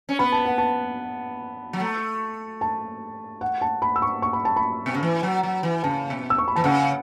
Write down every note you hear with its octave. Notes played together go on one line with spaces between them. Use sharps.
C#4
B3 B5
A5
F#5
A5
F#3
A3
A5
F#5
A5
B5
E6
C#6
C#6
B5
A5
B5
B2
C#3
E3
F#3
F#3
E3
C#3 A5
B2
E6
C#6
B5
E3 A5
C#3 F#5